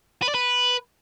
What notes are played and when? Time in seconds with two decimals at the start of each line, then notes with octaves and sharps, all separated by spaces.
0.22 B4
0.28 D5
0.35 B4